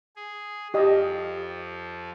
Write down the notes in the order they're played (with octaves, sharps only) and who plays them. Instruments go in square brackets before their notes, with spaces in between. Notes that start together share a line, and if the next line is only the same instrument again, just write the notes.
[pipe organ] G#4
[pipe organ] F2 F3 [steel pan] G4 D#5